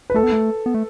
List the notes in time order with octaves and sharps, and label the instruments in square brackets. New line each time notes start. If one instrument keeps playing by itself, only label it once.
[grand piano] B4
[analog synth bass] A3 [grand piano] A4
[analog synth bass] B3
A3
B3
A3